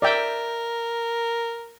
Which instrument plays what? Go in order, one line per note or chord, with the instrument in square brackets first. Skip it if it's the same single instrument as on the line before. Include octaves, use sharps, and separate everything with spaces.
[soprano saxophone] A#4 [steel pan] D5 E5 G5